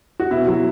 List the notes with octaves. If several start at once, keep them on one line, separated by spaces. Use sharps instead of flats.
F#4
B2 E4
F#3